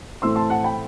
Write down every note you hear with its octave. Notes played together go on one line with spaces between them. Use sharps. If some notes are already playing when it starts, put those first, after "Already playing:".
A2 E3 A3 C4 C6 E6
A5 C6
F#5 A5
G5 B5